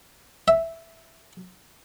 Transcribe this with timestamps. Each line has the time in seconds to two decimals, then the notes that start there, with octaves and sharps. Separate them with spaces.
0.48 E5